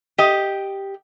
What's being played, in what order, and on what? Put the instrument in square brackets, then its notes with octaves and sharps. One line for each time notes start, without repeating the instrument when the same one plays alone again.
[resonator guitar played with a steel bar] G4 D#5